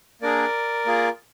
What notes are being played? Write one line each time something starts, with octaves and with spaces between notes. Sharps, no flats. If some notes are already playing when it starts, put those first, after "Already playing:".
A#3 D4 G#4 A#4 D5
A#3 F4 G#4